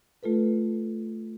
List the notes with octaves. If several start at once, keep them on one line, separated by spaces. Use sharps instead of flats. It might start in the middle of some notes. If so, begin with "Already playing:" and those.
A3 F4 A4 B4